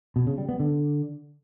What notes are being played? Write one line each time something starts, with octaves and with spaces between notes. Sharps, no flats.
B2
C#3
G3
B3
D3